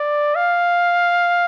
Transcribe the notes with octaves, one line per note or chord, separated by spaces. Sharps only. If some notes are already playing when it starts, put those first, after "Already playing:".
Already playing: D5
F5